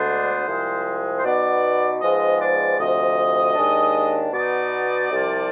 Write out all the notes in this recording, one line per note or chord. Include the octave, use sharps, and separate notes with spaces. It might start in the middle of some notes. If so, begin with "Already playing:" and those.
Already playing: D2 D3 G#3 B3 D4 C5
C2 C3 F3 G#3
C5
B2 B3 D#4 D5
G#2 F3 G#3 B3 D#5
D5
D2 C3 F3 D#5
D#2 D#3 G#3 D4
B2 B3 D#4 D5
C2 C3 F3